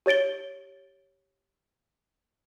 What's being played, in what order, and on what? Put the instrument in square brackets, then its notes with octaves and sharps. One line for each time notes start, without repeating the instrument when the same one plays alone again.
[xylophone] G4 C#5 A6 D7 G7